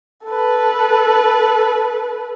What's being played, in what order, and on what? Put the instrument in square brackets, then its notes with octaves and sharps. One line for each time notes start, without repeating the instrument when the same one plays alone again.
[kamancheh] A4 B4